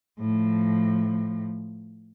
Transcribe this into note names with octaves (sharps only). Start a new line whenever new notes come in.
A2 F3